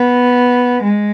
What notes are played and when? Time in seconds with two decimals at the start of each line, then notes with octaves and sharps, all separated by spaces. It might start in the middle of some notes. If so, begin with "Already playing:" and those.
Already playing: B3
0.83 G#3